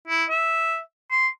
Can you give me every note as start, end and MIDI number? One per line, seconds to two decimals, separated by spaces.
0.08 0.25 64
0.30 0.80 76
1.11 1.28 84